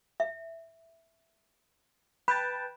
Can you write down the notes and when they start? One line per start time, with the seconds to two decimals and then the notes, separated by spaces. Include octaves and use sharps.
0.20 E5
2.28 B4 G5 A5 B5